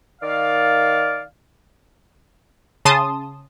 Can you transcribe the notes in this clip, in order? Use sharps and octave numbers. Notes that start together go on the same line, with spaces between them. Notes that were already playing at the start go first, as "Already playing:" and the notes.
D#3 D5 F5
C#3 A5 C6 D#6